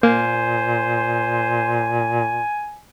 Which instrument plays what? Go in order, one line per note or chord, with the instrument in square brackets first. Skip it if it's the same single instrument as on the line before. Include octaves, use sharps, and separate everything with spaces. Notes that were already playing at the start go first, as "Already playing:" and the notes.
[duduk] A#2 [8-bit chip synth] A#3 [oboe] C5 [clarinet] G#5